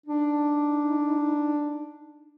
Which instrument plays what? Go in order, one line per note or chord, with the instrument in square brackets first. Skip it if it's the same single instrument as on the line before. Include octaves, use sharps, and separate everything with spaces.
[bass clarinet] D4 [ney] D#4